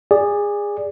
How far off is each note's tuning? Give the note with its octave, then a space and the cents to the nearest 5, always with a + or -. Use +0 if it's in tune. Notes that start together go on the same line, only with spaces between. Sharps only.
G#4 -20 D5 +0